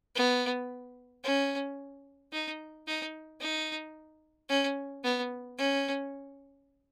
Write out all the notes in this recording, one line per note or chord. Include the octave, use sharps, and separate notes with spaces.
B3
C#4
D#4
D#4
D#4
C#4
B3
C#4